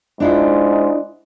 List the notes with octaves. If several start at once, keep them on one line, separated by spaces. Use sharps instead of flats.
G#2 D4 E4 F4